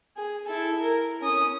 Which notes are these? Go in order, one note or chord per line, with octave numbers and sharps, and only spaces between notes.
G#4
E4 A4
A#4
C#4 D#6